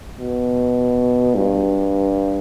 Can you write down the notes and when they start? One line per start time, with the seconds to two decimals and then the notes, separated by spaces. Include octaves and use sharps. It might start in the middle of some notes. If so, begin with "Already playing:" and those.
0.19 B2
1.35 G2